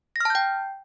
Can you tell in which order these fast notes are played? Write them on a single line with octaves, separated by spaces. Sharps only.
A#6 F6 A5 G6 G5